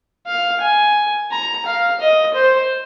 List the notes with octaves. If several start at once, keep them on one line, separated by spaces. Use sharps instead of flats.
F5
G#5
A#5
F5
D#5
C5